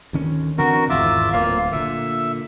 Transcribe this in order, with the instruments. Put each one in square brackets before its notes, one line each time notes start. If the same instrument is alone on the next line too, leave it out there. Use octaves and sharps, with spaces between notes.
[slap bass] D2 D#3 C#4
[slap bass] D3 E3 C4 [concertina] F#4 A#4
[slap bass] G#1 E2 G#2 [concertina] F4 E5 D6
[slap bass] D1 [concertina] A#3 F4 F5
[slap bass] A#2 D3 [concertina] E5